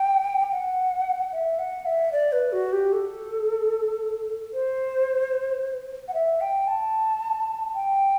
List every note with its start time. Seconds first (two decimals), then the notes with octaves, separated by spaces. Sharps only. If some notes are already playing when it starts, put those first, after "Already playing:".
Already playing: G5
0.51 F#5
1.32 E5
1.59 F#5
1.86 E5
2.12 D5
2.32 B4
2.52 F#4
2.72 G4
2.93 A4
4.53 C5
6.08 F#5
6.14 E5
6.41 G5
6.68 A5
7.74 G5